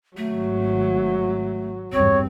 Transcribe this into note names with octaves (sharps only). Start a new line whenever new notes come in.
G#1 F#3 A3
A1 E2 G2 C4 C#5